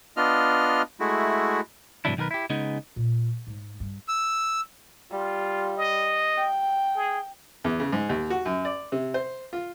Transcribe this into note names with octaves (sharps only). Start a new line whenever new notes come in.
B3 D4 F4 D#5 F6
G#3 A3 E4 F#4
G#2 C3 E3 F#3 D4 E4
B1 D#3 G4 A#4 B4
E4 G4
C#3 G#3 B3 D#4
A#2
G#2 G#3
G2
E6
G3 F4
D#5
G5
G#4
E2
C#3
G#2
D#2
F#4
F#2
D5
C3
C5
F4